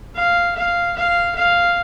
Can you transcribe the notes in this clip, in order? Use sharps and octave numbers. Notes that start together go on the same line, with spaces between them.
F5
F5
F5
F5